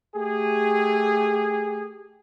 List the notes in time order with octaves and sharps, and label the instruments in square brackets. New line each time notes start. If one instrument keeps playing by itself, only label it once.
[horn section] A3 G4 G#4